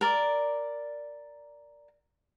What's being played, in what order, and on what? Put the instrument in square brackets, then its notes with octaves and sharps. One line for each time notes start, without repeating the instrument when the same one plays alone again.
[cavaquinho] A#4 D5